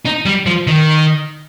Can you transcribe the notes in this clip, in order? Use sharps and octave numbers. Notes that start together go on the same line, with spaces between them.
D#4
G3
F3
D#3